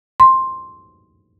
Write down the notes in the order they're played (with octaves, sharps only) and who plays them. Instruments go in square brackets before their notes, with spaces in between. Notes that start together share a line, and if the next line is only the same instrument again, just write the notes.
[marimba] C6